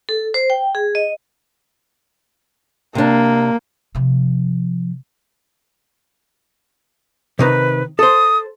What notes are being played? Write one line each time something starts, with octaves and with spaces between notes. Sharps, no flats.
A4
C5
G5
G#4
D#5
C3 A#3 D4
C3 F3
C3 D#3 D#4 B4
A4 C5 D#6